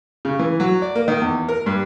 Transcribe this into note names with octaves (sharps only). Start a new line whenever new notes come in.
C#3
E3
F#3
D5
A#3
D#3
E2
A#4
G2